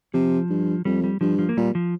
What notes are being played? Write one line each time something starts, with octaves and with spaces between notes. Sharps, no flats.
C3 F3
G2
F2 G3
G3
G2 F3
F3
A#3
A#2 G3
F3